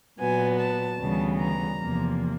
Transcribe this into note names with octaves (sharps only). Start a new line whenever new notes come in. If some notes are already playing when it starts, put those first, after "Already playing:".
A#2 F#3 B3 G#5
A5
D2 C#3 E3 G3 B3
A#5
E2 C3 F3 A#3